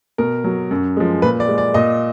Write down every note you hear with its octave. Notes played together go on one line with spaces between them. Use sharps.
B2 A#4
F#3
F#2
F3 G#3
A#2 B4
D5
G#3
D5
A#2 D#5